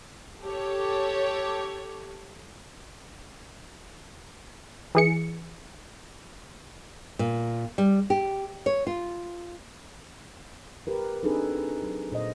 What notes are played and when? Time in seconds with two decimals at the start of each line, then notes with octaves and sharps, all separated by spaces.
0.43 G4 A4 C#5
4.95 E3 G#4 C#7
7.19 A#2
7.78 G3
8.10 G4
8.66 C#5
8.87 F4
10.87 G4 A#4 B4
11.23 C4 D4 D#4 G#4 A4 B4
11.82 F#3
12.12 A#2 C5 D#5